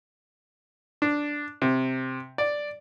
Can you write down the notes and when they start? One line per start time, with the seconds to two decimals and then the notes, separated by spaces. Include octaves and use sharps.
1.02 D4
1.62 C3
2.38 D5